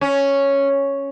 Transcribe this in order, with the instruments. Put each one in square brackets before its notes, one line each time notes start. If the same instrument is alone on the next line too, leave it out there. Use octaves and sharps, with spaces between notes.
[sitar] C#4